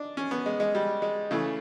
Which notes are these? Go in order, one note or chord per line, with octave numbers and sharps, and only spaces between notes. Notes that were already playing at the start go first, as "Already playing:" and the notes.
Already playing: D4 D#4
C#4
B3
G#3
G#3
G3
G#3
C#3 E3 A3